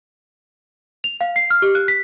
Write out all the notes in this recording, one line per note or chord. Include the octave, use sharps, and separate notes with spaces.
F7
F5
C7
F6
G4
F#6
B6